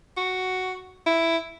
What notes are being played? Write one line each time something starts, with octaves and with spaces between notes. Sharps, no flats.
F#4
E4